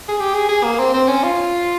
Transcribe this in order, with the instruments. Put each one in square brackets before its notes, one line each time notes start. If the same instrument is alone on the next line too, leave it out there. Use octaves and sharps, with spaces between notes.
[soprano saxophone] G#4
G4
G#4
G#4
A#3
C4
C4
C#4
F4